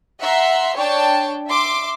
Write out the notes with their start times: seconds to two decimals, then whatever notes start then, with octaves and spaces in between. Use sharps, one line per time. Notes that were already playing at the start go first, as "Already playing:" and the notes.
0.22 E5 F#5 A#5 C6
0.77 D4 C#5 G5 A5
1.49 E5 C6 D6